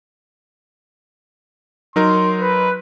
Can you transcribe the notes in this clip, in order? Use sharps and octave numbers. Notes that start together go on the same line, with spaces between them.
F#3 D#4 A#4 C6
B4